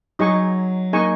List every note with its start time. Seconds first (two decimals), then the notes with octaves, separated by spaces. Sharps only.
0.19 F#3 D#4 G#4 D#5 G#5 C#6
0.93 A#3 D#4 G#4 D#5 G#5 C#6